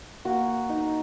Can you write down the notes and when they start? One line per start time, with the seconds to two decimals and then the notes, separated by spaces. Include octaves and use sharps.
0.25 A#3 F#4
0.69 D#4